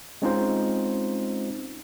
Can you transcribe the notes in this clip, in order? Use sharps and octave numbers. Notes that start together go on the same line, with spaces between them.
G#3 C4 C#4 D#4 F4 C5